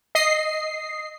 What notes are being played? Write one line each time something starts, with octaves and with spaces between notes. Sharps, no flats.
D#5 C7